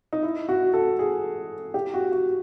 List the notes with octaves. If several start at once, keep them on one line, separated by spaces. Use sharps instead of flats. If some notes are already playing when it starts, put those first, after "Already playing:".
D#4
E4
F#4
A4
G#4
G4
F#4
F#4